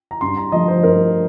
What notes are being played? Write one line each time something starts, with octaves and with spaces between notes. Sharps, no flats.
A#5
G2 C6
A#5
F3 A3 D#5
C5
G2 A#4